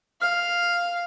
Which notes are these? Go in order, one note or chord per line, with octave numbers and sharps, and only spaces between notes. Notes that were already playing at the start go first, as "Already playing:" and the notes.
F5 F6